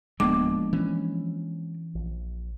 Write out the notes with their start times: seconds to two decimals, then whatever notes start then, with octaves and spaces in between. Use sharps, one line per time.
0.20 D1 F3 G#3 A#3 B3 D4 D6
0.73 E3 C#4
1.95 A#1